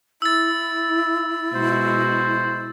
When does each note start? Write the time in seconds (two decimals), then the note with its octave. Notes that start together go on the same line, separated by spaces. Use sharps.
0.22 E4 E6 A6
1.55 B2 G#3 F#4 C5